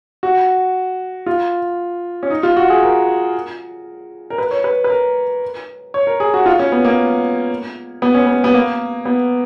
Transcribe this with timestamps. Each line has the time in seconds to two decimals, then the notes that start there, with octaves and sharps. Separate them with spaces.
0.23 F#4
1.26 F4
2.23 C#4
2.30 D#4
2.43 F4
2.57 F#4
2.70 G#4
2.83 A#4
4.30 A#4
4.38 B4
4.51 C#5
4.64 B4
4.84 B4
4.90 A#4
5.94 C#5
6.07 A#4
6.20 G#4
6.34 F#4
6.46 F4
6.59 C#4
6.72 B3
6.85 A#3
8.02 B3
8.14 C#4
8.26 B3
8.44 B3
8.54 A#3
9.05 B3